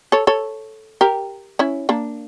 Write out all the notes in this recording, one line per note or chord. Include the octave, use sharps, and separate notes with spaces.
A4 C#5
A4 C#5
G4 A#4
C#4 E4
A#3 D4